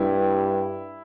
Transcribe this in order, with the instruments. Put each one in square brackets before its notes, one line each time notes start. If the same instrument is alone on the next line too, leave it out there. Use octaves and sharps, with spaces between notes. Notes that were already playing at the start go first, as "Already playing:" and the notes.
Already playing: [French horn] G2 [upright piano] E4